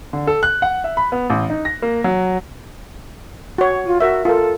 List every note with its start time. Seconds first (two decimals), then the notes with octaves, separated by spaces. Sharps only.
0.13 D3
0.27 A4
0.43 F#6
0.62 F#5
0.84 E5
0.97 B5
1.12 B3
1.30 A1
1.50 D#4
1.65 A#6
1.82 A#3
2.04 F#3
3.58 F#4 C#5
3.85 F4
4.01 F#4 A#4 E5
4.25 F4 A4 A#4